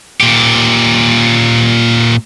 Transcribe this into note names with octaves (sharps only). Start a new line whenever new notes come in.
A#2 G4